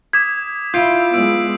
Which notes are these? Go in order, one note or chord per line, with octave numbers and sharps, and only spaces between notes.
D6 D#6 G#6 B6
E4 F4 G6 C7 D7
G#3 B3 E6 D7